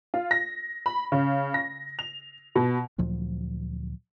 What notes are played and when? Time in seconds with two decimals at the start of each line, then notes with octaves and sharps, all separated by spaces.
0.14 F4
0.31 A#6
0.86 B5
1.12 C#3
1.54 A#6
1.99 F7
2.55 B2
2.98 D2 A#2 F3 F#3